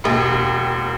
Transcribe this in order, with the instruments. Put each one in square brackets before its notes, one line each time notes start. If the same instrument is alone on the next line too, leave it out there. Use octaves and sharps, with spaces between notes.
[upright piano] E1 D#2